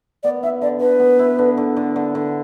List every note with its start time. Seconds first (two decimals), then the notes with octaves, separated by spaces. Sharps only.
0.23 B3 D5
0.43 E4 E5
0.61 D3 D5
0.81 D3 B4
1.00 B3
1.19 E4
1.39 D3
1.57 D3
1.76 D3
1.96 D3
2.15 D3